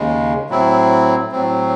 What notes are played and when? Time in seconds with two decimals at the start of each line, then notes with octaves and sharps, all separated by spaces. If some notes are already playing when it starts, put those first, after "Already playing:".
Already playing: D#2 C#3 G#3
0.50 A2 F#3 C4 E4
1.32 A2 F#3 C4